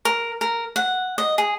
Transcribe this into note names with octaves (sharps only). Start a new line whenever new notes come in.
A#4
A#4
F#5
D#5
G#4